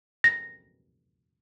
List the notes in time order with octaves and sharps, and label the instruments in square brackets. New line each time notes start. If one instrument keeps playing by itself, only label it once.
[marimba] A#6